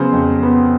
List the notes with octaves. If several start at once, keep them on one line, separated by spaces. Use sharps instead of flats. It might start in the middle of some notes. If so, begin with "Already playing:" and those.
Already playing: C#3 F#3 B3 C5
F2
B3